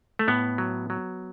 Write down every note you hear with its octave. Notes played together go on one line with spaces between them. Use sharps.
A3
A2 B3
F#3
F#3